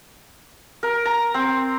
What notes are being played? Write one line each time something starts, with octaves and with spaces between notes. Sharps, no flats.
A#4
A#5
C4